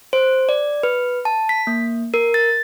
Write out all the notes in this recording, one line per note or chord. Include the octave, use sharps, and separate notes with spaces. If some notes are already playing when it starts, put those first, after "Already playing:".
C5
D5
B4
A5
B6
A#3
A#4
A6